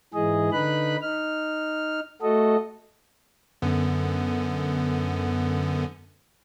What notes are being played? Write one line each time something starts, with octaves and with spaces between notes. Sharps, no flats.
G#2 E3 G#4 D#5
D3 D#4 B4 B5 F#6
D#4 F6
A3 F#4 A4 D#5
F#2 D3 B3